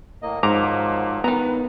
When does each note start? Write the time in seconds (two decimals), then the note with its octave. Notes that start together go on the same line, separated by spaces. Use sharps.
0.22 A2 A#3 D#5
0.43 G#2 D#3 F3 F#3 A#5 D6
1.24 D#3 B3 B4 A#5